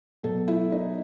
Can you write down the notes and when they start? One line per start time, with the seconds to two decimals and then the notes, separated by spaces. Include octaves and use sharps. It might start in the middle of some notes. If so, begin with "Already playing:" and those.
0.23 B2 F#3 A4
0.48 E4
0.72 D#4